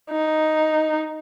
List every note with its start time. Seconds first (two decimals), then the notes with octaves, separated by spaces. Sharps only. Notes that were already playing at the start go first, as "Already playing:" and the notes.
0.11 D#4